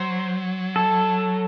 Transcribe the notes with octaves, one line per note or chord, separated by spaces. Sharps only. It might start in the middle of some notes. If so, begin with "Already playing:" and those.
Already playing: F#3 C5
A4